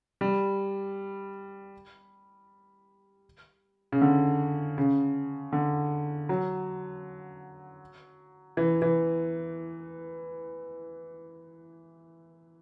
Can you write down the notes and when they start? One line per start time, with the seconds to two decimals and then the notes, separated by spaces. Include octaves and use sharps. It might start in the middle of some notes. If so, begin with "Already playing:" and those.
0.21 G3
3.92 C#3
4.01 D3
4.78 C#3
5.52 D3
6.29 F#3
8.57 E3
8.82 E3